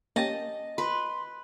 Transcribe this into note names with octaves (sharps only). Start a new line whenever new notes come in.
A#3 C#4 G4 D#5 A5
B4 C6